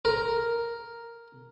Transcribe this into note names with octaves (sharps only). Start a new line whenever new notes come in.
A#4